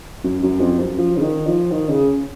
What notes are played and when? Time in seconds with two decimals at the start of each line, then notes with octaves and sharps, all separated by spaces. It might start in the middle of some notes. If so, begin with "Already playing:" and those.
0.24 F#2
0.43 F#2
0.60 F2
0.80 F#2
0.97 F3
1.17 C#3
1.22 D#3
1.47 F3
1.71 D#3
1.89 C#3